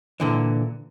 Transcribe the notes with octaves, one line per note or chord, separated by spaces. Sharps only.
A#2 D3 E3